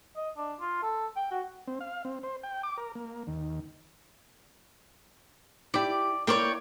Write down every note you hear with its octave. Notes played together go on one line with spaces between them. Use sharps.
D#5
D4
F4
A4
G5
F#4
C4
F5
C4
C5
G5
D6
A#4
A#3
D#2
E4 G4 D5
A#3 E4 A#4 C#5 D5 G5